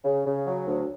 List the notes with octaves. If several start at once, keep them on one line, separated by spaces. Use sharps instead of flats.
C#3
C#3
F#3
D2